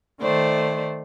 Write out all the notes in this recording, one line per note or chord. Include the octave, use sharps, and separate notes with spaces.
D#3 A3 C5 D5